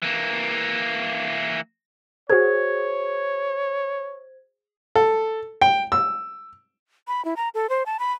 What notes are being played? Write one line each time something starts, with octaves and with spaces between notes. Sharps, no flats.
E3 A#3
F#4 G#4 C5 C#5 G#6
A4
G5
E6
B5
E4
A#5
A4
C5
A5
B5